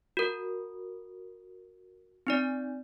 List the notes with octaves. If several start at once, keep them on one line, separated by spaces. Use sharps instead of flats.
F#4 A#4
C4 D#4 D5